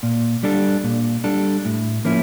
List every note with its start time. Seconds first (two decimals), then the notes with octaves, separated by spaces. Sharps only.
0.03 A#2
0.43 G3 D4 A4
0.84 A#2
1.24 G3 D4 A4
1.65 A2
2.05 F3 A#3 C#4 E4